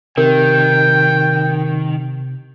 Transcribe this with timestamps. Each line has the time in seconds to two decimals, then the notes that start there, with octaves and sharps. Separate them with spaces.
0.17 C3 D#3 A#4 G5